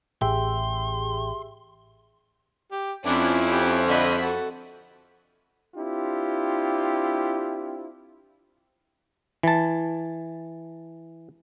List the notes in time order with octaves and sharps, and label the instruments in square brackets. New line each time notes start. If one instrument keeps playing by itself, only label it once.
[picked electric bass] A1 [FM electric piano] G4 G#4 E5 [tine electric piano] G5 [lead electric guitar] C6
[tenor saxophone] G4
[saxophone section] F2 [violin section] C#4 E4 [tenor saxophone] D4
[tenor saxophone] G4
[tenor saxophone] D3 [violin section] D#5 E5 B5
[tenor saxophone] F#4 [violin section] A4
[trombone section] C4 D4 E4 F4 G4
[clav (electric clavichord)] E3 A5